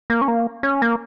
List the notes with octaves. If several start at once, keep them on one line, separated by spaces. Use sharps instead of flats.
A#3
C#4
A#3
C#4
A#3